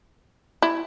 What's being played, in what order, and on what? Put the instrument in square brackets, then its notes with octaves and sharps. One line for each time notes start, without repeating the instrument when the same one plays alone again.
[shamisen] E4